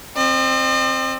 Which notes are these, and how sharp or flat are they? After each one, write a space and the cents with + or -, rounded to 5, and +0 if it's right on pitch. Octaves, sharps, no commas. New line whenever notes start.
C4 +15 D#5 -45